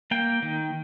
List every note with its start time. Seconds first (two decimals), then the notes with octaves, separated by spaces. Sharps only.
0.11 A#3 G5
0.42 D#3